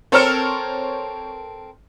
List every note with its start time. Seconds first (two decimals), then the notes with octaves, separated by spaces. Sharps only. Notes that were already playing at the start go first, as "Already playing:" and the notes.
0.12 C4 A4 A#4 C5 C#5 F6